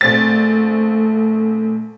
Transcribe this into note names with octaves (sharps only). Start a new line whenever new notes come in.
A#1 A3 C4 A6